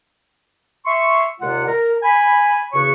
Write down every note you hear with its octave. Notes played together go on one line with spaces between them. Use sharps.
E5 C6 C#6
D#2 C3 G#3 F4 D5 F#5
A#4
G#5 B5
E2 C#3 F#4 C#5 C#6